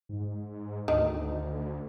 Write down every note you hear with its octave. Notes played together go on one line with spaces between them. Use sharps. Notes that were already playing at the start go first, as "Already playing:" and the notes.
G#2
D2 D#3